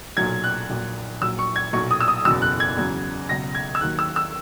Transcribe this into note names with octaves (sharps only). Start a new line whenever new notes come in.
B1 A#2 F#3 G#6
F#6
A#1 A#2 F#3
A#1 A#2 F#3 E6
C#6
G#6
B1 A#2 F#3 C#6
D#6
E6
D#6
F#1 E2 B2 F#3 E6
F#6
G#6
E2 C#3 F#3
C#2 B2 F#3 A#6
G#6
E6
D#2 D#3 F#3 F#6
E6
E6